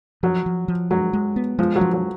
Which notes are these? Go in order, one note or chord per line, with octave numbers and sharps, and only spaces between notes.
F3 F#3
F3
F3
F#3 G#3
G#3
B3
F3 G#3
F#3
F3
F#3